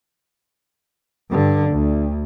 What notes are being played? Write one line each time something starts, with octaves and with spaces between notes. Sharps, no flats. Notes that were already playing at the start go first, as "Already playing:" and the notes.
G2 D3
D2